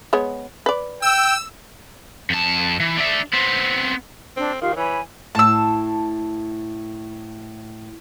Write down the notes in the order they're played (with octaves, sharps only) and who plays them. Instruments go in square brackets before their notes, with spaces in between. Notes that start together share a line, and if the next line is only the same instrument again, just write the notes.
[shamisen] G#3 B3 C#5
B4 D5
[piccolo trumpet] G5 [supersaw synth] E6
[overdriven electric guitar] F2 A5
E3
D4 E5
B3 C4
[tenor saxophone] C4 [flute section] D4
[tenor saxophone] D#3 [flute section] F4 G4 F5
[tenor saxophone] E3 [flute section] C#5 G#5 B5
[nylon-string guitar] A2 [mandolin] A5 E6